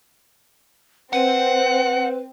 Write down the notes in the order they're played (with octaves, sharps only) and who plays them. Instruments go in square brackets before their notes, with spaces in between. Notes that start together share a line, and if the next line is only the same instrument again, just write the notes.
[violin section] C4 [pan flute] B4 [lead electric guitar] F#5